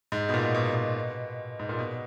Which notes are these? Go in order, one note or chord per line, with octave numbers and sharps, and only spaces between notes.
G#2
B2
A#2
B2
B2
G#2
A#2
B2